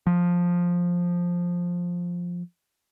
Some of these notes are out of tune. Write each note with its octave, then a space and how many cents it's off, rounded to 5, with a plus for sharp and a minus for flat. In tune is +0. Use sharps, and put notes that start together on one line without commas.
F3 +10